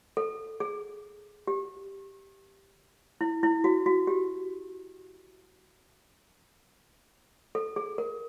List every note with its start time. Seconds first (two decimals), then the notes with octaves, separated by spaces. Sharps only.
0.17 A4
0.60 G#4
1.47 G4
3.21 E4
3.43 E4
3.64 F#4
3.86 F#4
4.07 G4
7.55 A4
7.76 G#4
7.98 A#4